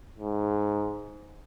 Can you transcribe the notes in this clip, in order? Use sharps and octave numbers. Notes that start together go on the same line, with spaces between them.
G#2